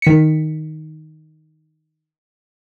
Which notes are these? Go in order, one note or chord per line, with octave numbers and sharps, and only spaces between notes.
D#3 B6 C#7